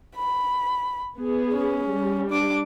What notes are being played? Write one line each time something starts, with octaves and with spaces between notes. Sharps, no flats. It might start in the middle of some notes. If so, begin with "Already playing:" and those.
B5
B3 G#4
C#4
G3
D4 D6